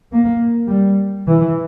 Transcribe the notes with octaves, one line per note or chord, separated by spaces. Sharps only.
A#3
G3
E3